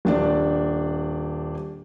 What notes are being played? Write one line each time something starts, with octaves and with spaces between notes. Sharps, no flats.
D#1 D4 D5